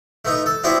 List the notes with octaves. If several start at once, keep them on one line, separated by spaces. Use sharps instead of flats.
A3 B3 D#4
A4
B3 C4 D4 E4 F#4